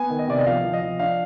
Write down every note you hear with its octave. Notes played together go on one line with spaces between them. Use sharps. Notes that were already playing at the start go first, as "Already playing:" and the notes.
Already playing: B3 G#5
D#3
D#5
C3 D5
D#5
F3 F5
F3
D#5
F3
D4 F5